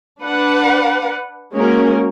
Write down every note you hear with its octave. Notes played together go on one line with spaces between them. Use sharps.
D4 B4 F#5
G#3 A#3 C#4 F#4 A#4